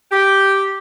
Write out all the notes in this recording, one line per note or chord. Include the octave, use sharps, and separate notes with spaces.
G4